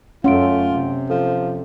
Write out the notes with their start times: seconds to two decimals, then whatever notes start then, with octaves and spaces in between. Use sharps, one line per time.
0.24 F#2 A3 C#4 F4 F#5 C6 D7
0.71 C3
1.10 F3 A4